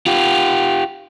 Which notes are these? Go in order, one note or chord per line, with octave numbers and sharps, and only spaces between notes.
F4 G4